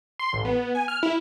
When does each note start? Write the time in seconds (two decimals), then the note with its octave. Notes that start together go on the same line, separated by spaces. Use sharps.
0.19 C6
0.33 A1
0.45 B3
0.75 G#5
0.88 F6
1.03 E4